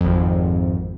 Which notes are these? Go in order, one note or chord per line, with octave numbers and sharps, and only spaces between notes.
G#1 F2